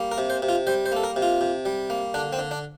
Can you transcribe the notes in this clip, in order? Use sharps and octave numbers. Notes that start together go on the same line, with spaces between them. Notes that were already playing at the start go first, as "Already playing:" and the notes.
Already playing: G3 A#3
A#4
C3
C5
C3
F4
G3 C5
C5
A#3 A4
A#4
C3
F4
C3
G3
A#3
D3 D4
C4
D3
D4